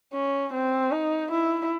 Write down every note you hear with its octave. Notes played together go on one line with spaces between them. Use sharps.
C#4
C4
D#4
E4